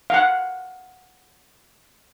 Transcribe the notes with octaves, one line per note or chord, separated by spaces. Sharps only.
F5 F#5